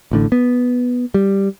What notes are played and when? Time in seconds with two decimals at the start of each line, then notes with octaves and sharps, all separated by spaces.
0.11 A1 A2 D3
0.32 B3
1.14 G3